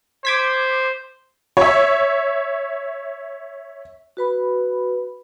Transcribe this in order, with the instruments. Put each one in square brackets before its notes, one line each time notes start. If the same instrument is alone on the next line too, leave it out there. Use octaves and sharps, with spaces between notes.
[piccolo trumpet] C5 [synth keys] D6 G#6 B6
[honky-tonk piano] C#5 E5
[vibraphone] F#4 B4 B5